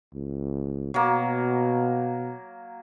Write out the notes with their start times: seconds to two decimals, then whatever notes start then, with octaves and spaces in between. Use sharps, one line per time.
0.14 C#2
0.94 B2 F#3 A#3